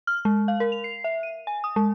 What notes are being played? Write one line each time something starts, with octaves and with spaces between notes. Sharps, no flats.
F6
G#3
F5
A#4
F7
C7
E5
D#7
G#5
D#6
G#3